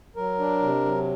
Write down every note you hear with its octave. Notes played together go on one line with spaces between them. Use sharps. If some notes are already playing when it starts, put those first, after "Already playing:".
F#3 A#4
D4
C3
F#3